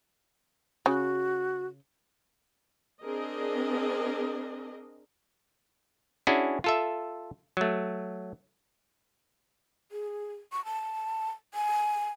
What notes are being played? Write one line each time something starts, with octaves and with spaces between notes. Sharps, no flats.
C#3 F#4
C4 D4 G#4 A#4 D#5
C#4 D4 E4 F#4 G#4
F4 A4 E5
F#3 A3
G#4
C#6
A5
G#5